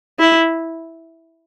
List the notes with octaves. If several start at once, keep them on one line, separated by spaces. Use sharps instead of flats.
E4